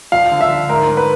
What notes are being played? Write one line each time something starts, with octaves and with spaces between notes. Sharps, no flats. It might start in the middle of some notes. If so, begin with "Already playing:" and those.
F3 F5
D3
E5
D3
G#2 A#4
G#2
B4